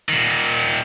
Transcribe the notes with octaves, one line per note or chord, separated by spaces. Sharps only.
A#2 D#3